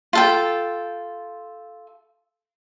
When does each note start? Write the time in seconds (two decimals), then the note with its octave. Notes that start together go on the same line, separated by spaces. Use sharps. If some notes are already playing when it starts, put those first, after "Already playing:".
0.13 F4 A4 G5